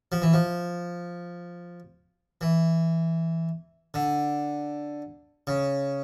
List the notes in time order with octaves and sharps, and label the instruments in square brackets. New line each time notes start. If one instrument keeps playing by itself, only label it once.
[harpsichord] F3
E3
F3
E3
D3
C#3